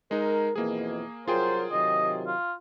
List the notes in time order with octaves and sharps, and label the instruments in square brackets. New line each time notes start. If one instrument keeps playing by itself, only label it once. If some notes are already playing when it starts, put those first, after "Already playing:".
[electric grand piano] G#3 D#4 [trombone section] A#4
[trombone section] F2 B2 E3 [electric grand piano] A#3 G#4
[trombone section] C2 F#3 A#4 [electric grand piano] F4 G#4 G5 [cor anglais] C5
[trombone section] C3 D#3 F#3 [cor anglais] D#5
[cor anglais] F4